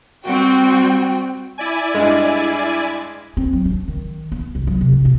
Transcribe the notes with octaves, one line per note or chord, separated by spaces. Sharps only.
G3 C4 F#4 G5
E4 D5 G#5
G2 G#3
C4
F#3
D4
D#3
B3
C2
F#3
C3
F3
B2